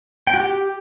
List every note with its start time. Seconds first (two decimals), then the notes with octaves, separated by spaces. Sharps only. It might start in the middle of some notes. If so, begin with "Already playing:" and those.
0.27 G5
0.34 F#4
0.40 G4